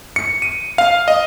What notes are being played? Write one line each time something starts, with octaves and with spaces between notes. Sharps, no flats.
C#7
D#7
F5
D#5